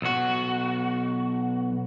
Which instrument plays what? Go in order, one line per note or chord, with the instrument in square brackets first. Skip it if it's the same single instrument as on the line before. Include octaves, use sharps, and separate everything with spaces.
[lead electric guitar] B1 F#4